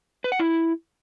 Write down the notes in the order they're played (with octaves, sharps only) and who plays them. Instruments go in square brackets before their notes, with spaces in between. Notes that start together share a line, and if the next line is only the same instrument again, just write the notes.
[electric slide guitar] B4
F#5
E4